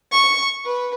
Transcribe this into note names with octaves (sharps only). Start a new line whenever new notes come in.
C#6
B4